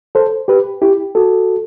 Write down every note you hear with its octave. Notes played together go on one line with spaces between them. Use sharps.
A4 C5
G4 B4
E4 G4
F#4 A4